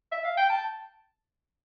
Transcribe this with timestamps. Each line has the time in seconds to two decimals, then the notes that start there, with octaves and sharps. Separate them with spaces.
0.12 E5
0.24 F5
0.37 G5
0.50 A5